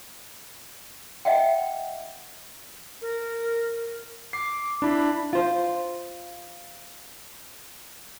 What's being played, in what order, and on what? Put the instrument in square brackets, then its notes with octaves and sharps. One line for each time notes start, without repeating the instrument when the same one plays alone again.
[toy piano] D#5 E5 F#5 G5
[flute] A#4
[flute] D6 [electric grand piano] C7
[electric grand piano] D4 E4 [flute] B5
[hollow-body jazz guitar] F4 C5